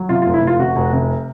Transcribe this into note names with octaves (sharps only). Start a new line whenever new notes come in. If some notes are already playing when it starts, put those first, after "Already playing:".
Already playing: F#3
C3 F4
F4
F1
E4
F1
F4
C3 F#4
F1
C3